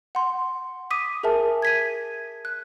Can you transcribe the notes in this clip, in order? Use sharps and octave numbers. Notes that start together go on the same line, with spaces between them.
F#5 C6
D6 D#6 B6 D#7
G#4 A#4 E5 G#5 A5
G#6 B6 D#7
F#6